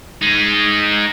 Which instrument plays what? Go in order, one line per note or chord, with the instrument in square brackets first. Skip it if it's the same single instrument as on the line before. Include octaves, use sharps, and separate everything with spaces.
[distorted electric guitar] G#3 D#4